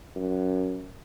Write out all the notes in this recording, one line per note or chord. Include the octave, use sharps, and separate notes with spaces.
F#2